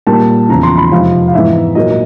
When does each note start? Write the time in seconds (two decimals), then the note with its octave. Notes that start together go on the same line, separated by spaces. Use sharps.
0.07 A#2 G3 A#3 A5
0.49 E2 C#3 F3 A#5
0.63 C6
0.78 B5
0.91 F2 C3 F3 G#3 F5
1.28 F5
1.34 G#2 E3 G#3 B3 E5
1.75 A#2 F#3 A#3 D#5